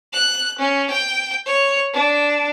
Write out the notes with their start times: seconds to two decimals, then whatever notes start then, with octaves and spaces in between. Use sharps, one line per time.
0.13 F#6
0.58 C#4
0.90 G5
1.46 C#5
1.94 D4